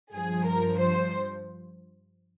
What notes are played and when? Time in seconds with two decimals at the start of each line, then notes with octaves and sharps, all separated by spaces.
0.13 G2 F3 G#4
0.47 A#4
0.80 C5